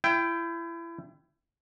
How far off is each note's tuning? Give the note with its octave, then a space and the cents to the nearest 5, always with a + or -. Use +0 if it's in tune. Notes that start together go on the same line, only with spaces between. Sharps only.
E4 +30 G5 +0